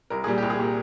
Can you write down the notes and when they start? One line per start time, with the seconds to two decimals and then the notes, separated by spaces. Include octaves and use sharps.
0.10 C2 A#4
0.24 A#2 G3 G#4
0.38 C2 G4
0.50 G#4
0.59 A#2 G3